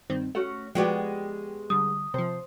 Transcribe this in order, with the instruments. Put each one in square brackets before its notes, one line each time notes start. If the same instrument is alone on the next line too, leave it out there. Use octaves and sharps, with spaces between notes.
[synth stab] G2 D#3 C4
[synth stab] A3 [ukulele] C#4 F#4 F#5
[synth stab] F3 [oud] G#3 B3 G4 [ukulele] F#4 D5 G5
[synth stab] D3 G3 [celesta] D#6
[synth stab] C3 F3 [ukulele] C5